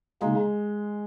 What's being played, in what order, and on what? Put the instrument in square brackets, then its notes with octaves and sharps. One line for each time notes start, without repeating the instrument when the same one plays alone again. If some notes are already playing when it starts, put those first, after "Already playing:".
[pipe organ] C#3 A#3 D#4 [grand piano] G#3